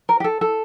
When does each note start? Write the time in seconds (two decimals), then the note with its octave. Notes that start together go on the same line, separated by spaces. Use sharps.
0.09 A#4
0.20 G4
0.24 A4
0.41 A4